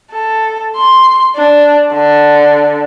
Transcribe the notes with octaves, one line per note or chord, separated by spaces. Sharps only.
A4
C6
D4
D3